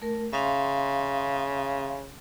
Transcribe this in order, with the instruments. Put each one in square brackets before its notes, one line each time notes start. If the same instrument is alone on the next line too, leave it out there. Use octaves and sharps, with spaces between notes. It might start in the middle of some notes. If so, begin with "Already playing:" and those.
[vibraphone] A3 A#4
[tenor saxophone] C#3 [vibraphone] E5 F5 C6